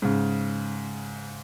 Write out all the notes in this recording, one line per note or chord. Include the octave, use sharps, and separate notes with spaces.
G#2 C#3